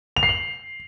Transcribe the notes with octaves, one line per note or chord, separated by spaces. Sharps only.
F7
C7
F#7